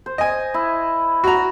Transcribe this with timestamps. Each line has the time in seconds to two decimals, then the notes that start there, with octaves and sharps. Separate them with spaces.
0.06 C5
0.18 D#5 G#5
0.54 E4
1.24 F#4 A#5